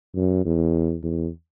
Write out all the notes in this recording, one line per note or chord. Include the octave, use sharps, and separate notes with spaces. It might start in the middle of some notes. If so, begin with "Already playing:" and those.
F#2
E2
E2